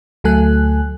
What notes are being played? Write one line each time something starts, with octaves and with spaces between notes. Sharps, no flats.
D2 F#3 A3 A4 G#5 F#6